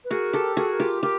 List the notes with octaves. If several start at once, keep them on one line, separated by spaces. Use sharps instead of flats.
B4
F#4 G#4 A#4
G4 A4
F#4 G#4 A#4
A4
A#4
F4 G4
F4 G4 A#4